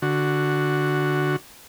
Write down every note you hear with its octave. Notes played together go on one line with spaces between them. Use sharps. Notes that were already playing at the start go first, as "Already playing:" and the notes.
D3 F#4